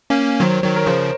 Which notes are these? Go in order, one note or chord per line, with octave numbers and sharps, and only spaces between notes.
A#3 C#4
D#3 F#3 C5
D#3 F#3 C#5
A#4
C#3 F3 C5